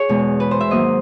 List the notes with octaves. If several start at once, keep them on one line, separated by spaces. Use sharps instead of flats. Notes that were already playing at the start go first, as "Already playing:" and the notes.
Already playing: G#4 C#5
E2 B2 G#3
B4
C5
E5
G#2 D#3 F#3 A#3 D#5